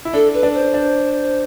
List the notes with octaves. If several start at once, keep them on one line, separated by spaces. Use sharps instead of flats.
E4
D4 A4
B4
D4
C5
D4